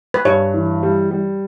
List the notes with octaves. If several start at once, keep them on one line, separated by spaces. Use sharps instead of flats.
B4
G2 C#5
E3
G3
G3